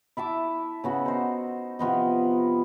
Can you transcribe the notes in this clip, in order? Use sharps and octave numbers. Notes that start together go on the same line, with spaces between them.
E4 E5 A5 D6
C#3 B3 F#4
D#4 C5
C3 F3 B3 D#5